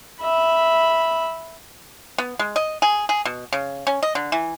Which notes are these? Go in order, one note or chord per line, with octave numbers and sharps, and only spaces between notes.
E5 B5
B3
G#3
D#5
G#4
G#4
B2
C#3
C#4
D#5
D3
E3